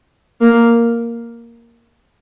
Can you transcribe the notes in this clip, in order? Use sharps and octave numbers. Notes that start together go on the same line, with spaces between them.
A#3